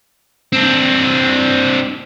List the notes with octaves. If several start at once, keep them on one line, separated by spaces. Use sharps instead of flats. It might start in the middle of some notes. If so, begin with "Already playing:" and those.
C4 D4